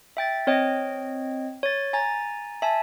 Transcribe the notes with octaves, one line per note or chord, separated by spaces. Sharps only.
E5 G5 A6
C4 C#5 D#5 G5
C#5 A6
G#5 A#5 A6
E5 G#5 A5